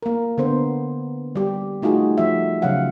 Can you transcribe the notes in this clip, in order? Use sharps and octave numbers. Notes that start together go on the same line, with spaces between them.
A#3 A#4
D3 B3 C5
G3 G4
A3 D#4 F4 F#4 G#4
F3 E5
C#3 F3 F#3 F5 F#5